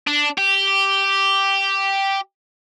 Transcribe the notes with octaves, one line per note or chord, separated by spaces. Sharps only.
D4
G4